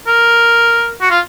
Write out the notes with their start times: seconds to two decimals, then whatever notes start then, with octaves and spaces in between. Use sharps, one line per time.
0.07 A#4
1.01 F#4
1.10 F4